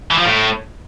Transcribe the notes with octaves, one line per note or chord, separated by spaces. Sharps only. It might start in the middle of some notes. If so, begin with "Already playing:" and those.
E3
F3
A2